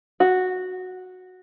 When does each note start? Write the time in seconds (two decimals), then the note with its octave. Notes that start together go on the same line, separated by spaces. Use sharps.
0.20 F#4